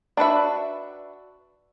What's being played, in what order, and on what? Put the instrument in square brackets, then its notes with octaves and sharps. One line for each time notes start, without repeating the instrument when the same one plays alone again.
[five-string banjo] D4 F#4 B4 E5